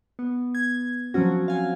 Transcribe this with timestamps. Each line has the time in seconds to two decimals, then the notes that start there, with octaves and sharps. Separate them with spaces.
0.19 B3
0.55 G#6
1.14 F3 F#3 C4 C#4 F#4
1.48 F5 G#5